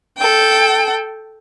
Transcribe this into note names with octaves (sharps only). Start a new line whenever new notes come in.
A4 G5